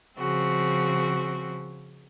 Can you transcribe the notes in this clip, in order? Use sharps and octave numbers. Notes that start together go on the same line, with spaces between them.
C#3 F3 C4 F#4